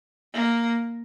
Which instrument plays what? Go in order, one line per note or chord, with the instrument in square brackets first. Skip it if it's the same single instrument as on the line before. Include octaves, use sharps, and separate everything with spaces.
[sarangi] A#3